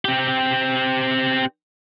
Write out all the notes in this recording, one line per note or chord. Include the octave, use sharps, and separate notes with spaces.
C4 G4